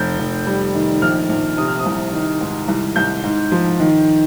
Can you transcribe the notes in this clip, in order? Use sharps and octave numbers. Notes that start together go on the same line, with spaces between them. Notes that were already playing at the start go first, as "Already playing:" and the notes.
Already playing: F1 G6
F1
G3
D#3
A#1 F6
A#1
C3 D#6
F6
D#6
C2
D#3
G#2
C2
C2 G6
G#2
F3
D#3